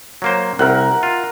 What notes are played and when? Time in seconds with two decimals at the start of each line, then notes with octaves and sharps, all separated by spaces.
0.22 F#3 A#3 C5
0.59 C2 A#4 E5 F#5
1.03 F4